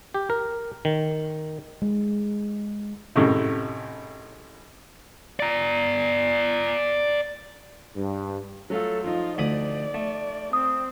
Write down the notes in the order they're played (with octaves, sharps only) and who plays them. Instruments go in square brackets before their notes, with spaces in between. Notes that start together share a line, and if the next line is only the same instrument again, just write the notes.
[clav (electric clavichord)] G4
A#4
D#3
[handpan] G#3
[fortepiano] G#1 F#2 A2 C3
[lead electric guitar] D5 A#5
[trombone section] G2
[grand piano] F#3 A3 F4 [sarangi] A4
[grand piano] F3 D#4 [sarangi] F4
[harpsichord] D2 B5 D#6 [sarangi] D5
[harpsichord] A3
[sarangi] C4 [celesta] D#6